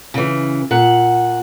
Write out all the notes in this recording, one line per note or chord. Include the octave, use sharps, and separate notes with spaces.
C#3 E3
A#2 F#5